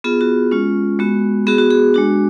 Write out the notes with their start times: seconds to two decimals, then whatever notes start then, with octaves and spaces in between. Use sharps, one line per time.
0.04 B3 F4 G#4
0.21 F#4
0.51 G#3 C#4 F4
0.99 G#3 B3 F#4
1.47 B3 F#4 G#4
1.58 F#4
1.70 G#4
1.94 G#3 D4 F#4